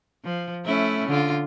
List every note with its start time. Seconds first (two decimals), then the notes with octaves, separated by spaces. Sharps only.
0.24 F3
0.66 A3 C#4 E4
1.09 D3 F4